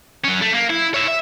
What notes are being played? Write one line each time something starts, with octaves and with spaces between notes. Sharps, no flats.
F#3 C#4
A3
A#3
E4
C#5 E5
E5